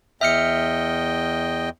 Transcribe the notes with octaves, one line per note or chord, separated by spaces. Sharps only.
E2 D#5 E5 G5 F6 C#7